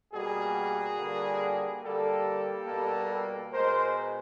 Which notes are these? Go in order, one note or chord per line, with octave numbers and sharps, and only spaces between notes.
B2 G3 A#3 F#4 G#4
D3 G3 A#3
D3 G3 A#3 G4 A4
B2 G3 A#3
B2 G#3 A#4 C5